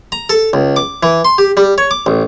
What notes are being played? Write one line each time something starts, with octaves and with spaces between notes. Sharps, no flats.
A#5
A4
C#2
D6
E3
C6
G4
G3
C#5
D6
A1